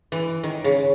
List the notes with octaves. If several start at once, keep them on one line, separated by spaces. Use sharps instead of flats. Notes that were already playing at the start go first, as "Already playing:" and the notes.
E3
D#3
C#3